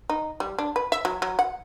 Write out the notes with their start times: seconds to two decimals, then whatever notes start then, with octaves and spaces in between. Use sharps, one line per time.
0.10 D#4
0.40 G3
0.59 D4
0.76 B4
0.92 E5
1.05 F#3
1.22 F#3
1.39 F#5